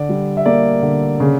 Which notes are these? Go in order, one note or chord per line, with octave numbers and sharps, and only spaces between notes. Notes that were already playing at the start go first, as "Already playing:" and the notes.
Already playing: D3 D5
G3
E5
A#3 D5
D3
C#3